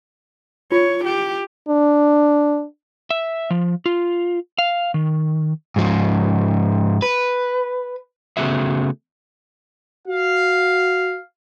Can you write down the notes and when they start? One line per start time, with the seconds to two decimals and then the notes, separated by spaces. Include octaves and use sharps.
0.72 F4 C#5
1.05 G4
1.69 D4
3.10 E5
3.50 F3
3.86 F4
4.58 F5
4.94 D#3
5.76 G#2 F3
7.02 B4
8.37 C#3 A3 B3 F#4 G#4 E5
10.07 F#4 F5